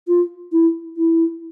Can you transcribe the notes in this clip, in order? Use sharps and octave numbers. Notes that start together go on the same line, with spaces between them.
F4
E4
E4